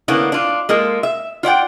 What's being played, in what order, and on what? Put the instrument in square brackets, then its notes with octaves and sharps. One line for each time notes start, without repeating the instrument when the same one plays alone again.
[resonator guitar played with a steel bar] D3 A#3 B3 C#4 E4
D4 F4
G#3 A#3 F4 A4
E5
F4 D5 F#5 G5